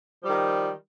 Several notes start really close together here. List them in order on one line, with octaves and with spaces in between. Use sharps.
F3 G3 D#3